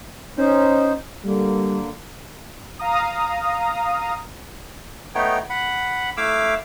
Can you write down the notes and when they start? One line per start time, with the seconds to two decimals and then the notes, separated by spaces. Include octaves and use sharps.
0.38 C#4 D#4 C5
1.25 D3 G3 A#3
2.79 F5 A#5 D#6
5.15 A3 B3 D#4 C#5 G5
5.50 F#5 B5
6.17 A3 E4 F5 D6 E6